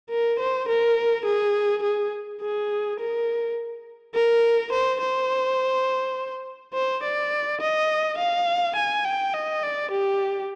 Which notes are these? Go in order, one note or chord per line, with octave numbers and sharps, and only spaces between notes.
A#4
C5
A#4
G#4
G#4
G#4
A#4
A#4
C5
C5
C5
D5
D#5
F5
G#5
G5
D#5
D5
G4